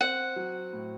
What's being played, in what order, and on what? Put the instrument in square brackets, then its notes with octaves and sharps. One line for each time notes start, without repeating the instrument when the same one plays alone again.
[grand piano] C4 [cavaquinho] F#5
[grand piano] F#3
A2